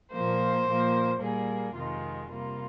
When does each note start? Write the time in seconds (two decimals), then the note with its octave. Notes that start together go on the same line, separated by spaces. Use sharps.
0.13 A#2 F3 A#3 C5
0.66 A#2 F3 A#3
1.20 A#2 G3 A#3 G#4
1.75 F2 C3 D#3 G#3 F4
2.29 C3 G3 A#3 F4